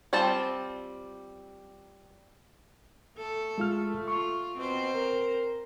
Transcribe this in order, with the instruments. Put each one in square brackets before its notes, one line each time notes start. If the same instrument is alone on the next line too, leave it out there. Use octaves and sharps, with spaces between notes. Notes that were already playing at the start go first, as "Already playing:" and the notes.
[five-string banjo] G3 C4 F4 A5
[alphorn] A3 [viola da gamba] A4
[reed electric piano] G#3 F4 F6
[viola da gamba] F4 [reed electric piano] C#6
[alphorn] B2 [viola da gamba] C4 C5
[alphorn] A#4